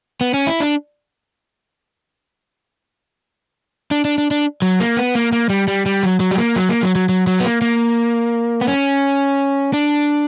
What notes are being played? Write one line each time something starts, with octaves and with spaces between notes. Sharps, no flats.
B3
C#4
E4
D4
D4
D4
D4
D4
F#3
A#3
B3
A#3
A#3
G3
G3
G3
F#3
F#3
G3
A#3
F#3
A#3
F#3
F#3
F#3
F#3
B3
A#3
A#3
B3
C#4
D4